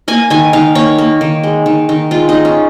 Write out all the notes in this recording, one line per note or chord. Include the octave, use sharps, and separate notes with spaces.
A#3 G#5
D#3 G#5
D#3 F5
A#3 C#5
A#3
D#3
G#3
D#3
D#3
G#3 F4
D#4
G#3
C#4